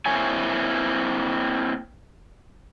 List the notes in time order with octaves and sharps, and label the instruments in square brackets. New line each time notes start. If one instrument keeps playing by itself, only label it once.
[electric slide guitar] A#3 C4 E4 C#5 G#5